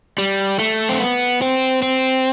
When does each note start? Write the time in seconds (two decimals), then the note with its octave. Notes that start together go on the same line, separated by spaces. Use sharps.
0.18 G3
0.59 A3
0.89 C4
1.00 B3
1.42 C4
1.82 C4